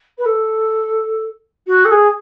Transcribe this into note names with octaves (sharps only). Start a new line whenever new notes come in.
B4
A4
F#4
A4
G#4